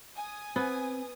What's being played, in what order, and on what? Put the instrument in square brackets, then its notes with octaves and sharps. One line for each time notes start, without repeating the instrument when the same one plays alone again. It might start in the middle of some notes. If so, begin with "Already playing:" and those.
[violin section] G#5 D#6
[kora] B3 [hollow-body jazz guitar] C4